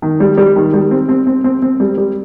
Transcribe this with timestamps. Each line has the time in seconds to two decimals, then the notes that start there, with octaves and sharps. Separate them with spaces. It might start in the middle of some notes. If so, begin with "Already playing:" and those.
0.02 D#3
0.20 G3
0.37 G3
0.56 D#3
0.74 G3
0.91 C4
1.09 C4
1.27 C4
1.44 C4
1.62 C4
1.80 G3
1.98 G3